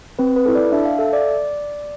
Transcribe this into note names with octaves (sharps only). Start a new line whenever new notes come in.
C4 B4
B4
E4 A4
D5
D4 E5
F5
A4 E5
D5